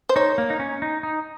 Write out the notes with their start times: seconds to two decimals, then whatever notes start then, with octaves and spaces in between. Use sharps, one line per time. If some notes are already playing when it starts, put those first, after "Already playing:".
0.09 C5
0.16 D#4 C#5
0.38 A#3
0.50 D#4
0.59 C#4
0.82 D#4
1.03 D#4